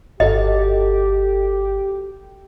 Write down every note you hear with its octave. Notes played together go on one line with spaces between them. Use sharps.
G1 F#4 G4 A4 D#5